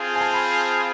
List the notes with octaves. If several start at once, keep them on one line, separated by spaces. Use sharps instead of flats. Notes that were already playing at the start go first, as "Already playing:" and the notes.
Already playing: C4 F4 G#4 C5 F5 A5
G#5
A5
B5